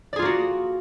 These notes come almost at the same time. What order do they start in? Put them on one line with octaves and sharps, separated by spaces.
D5 G#4 F4 A#3 F#4